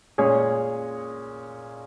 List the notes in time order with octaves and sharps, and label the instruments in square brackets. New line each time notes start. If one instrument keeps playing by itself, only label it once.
[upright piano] A#2 G#3 C#4 G#4 C#5